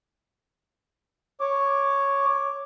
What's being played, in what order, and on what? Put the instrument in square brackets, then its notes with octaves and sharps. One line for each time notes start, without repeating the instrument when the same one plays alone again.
[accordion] C#5 D6